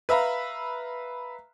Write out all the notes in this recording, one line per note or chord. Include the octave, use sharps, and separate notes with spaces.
B4 E5 F5 A#5 B5